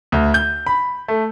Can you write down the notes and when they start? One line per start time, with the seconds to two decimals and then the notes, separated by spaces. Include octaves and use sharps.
0.12 D2
0.34 G6
0.66 B5
1.08 A3